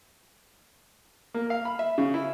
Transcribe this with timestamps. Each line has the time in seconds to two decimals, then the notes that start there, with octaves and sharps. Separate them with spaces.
1.34 A#3
1.50 F5
1.65 B5
1.79 E5
1.98 C#3
2.14 E4